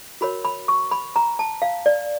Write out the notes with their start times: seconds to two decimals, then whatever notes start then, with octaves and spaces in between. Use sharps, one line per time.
0.21 F#4 A#4 C#5 B5
0.45 B5
0.68 C#6
0.91 B5
1.16 A#5
1.39 A5
1.62 F5
1.86 D5